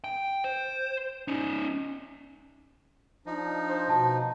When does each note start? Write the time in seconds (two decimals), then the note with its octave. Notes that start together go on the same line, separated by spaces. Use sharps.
0.04 G5
0.44 C5
1.28 C#4 D#4
3.26 F3 D4 D#4
3.68 C5
3.90 B2 A5